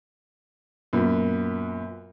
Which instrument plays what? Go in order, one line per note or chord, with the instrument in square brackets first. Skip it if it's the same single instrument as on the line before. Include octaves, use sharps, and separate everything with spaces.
[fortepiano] F#2 A#2 B3